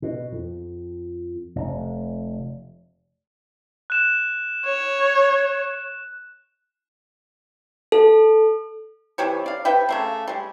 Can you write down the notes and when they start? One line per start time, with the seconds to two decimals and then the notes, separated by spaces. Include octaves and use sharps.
0.02 B2
0.32 F2
1.56 F1
3.90 F#6 E7
4.65 C#5
7.92 A4
9.18 C3 E3 G4 C#5
9.46 D5 F5
9.65 C3 B4 E5 G5
9.89 C#3 A3 A#3
10.28 G3 G#3